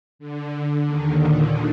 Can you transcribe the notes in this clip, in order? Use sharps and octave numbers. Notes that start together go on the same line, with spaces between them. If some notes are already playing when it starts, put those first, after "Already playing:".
D3
D#2 D#3
A#2